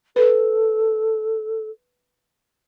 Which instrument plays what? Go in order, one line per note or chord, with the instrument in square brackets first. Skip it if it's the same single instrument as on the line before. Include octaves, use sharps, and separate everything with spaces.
[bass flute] A4 [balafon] B4